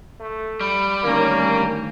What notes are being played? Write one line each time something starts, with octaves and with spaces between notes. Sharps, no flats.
A3
G3 B5
D2 D#3 A#3 C#4 A#4